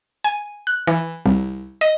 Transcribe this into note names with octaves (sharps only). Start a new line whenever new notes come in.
G#5
F#6
E3
C2
D#5